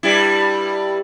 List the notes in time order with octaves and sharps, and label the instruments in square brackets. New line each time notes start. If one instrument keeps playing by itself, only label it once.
[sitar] G2 G3 E4